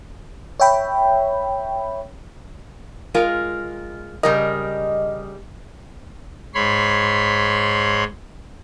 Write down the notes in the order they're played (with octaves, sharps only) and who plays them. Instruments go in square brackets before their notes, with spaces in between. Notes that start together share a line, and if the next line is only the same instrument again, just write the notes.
[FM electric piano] C#5 E5 G5 B5
[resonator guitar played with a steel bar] G#3 F4 A#4
[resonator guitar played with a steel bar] C#3 G3 A#4 [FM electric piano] D#5
[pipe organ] G#2 C#5 B5 C6